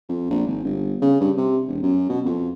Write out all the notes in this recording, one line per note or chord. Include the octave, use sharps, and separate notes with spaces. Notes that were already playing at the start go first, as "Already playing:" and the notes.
F2
A#1
G#1
G1
C#3
G2
C3
E1
F#2
B2
F2